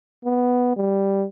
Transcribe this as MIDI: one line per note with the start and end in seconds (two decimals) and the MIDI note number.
0.25 0.75 59
0.77 1.25 55